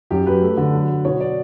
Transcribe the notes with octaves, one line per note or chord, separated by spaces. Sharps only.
F#2 G4
F#3 B4
A3
D3
F#3
F#3
B2 C#5
D5